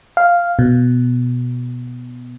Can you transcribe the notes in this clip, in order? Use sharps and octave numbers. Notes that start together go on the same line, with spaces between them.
F5
B2